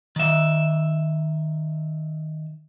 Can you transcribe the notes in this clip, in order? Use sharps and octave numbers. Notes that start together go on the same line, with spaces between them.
D#3 E5